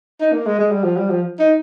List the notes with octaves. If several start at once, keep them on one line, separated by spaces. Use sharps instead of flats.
D#4
A#3
G#3
G#3
G3
F3
G3
F3
D#4